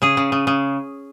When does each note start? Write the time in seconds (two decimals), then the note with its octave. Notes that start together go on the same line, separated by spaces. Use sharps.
0.02 C#3 G#4
0.17 C#3
0.32 C#3
0.47 C#3